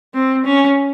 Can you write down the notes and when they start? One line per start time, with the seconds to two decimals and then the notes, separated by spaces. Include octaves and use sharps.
0.14 C4
0.45 C#4